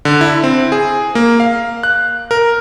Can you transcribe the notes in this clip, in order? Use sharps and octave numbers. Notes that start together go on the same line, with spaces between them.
D3
E4
C4
G#4
A#3
F5
F#6
A#4